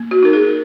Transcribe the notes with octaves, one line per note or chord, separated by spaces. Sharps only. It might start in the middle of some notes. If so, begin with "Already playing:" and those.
Already playing: A#3
F#4
D#4 A#4
G#4